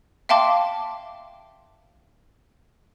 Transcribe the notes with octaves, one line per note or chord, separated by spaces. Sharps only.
E5 F5 G5 A5 C6 D6